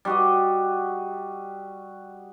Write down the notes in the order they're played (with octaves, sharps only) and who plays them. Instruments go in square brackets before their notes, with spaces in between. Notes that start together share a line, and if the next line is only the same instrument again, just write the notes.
[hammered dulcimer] G3 F#4 D#5